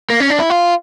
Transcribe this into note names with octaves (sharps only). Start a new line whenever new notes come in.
A#3
C#4
D4
E4
F4